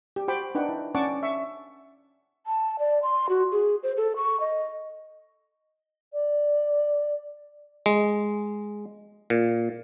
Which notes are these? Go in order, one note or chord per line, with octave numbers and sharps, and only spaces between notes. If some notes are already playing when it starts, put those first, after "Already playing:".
G4
F#4 G4 C5 G5 B5 D6
D4 D#4 B4 F#5 G5
E4
C#4 D5 F#5 A5 C#6 D6
E5 C#6
A5
D5
C6
F#4
G#4
C5
A4
C#6
D#5
D5
G#3
A#2